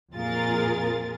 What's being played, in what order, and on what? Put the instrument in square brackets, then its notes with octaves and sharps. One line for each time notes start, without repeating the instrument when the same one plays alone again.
[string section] F2 A#2 F4 G#4 A#4 A6